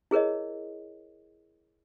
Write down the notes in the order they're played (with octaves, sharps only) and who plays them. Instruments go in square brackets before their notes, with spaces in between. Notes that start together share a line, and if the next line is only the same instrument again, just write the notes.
[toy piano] E4 G#4 A#4 C#5 D#5